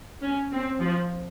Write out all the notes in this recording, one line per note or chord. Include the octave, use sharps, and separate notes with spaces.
C#4
C4
F3